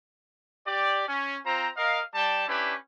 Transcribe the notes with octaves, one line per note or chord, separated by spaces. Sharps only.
G4 D5
C#4
C4 F4 C5 A#5
A#4 D#5 F5
G3 D5 G5 A5
C#4 D4 E4 G4 B4